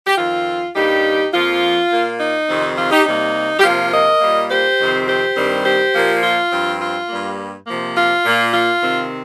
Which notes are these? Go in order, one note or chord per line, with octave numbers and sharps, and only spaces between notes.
G4
F2 D#3 C4 F4
G2 G3 A#3 D#4 G4
F2 F3 A#3 F4
A#2 A#3
D#4
F2 C3 D#3 C4
F4
D#4 G4
C3 G3 A#3 D#4
G4
C3 F3 A#3 F4
A#4 D#5
A#2 G3 A#3
G4 C5
F2 C3 D#3 C4
G4 C5
G2 D#3 G3 C4
G4 C5
A#2 F3 A#3
F4
G2 F3 C4
F4
G2 G3 A#3
C3 F3 A#3
F4
A#2 A#3
F4
C3 D#3 C4